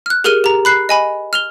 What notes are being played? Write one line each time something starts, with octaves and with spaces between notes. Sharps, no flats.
F6 F#6
G4 G#4 A#4 F6 D#7 G7
G4 A#5
B5 F#6 C7
D#5 G#5 B5
F6 F7 G7